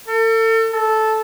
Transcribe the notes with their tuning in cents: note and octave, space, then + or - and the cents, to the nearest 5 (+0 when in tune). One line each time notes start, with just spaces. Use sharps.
A4 +35
A4 -10